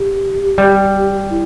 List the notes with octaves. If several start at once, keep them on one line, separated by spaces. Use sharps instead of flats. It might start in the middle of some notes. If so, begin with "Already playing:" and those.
Already playing: G4
G3
E4